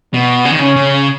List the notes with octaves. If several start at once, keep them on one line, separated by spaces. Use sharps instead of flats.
B2 B3
C#3
D#3
C#3 C#4
C#3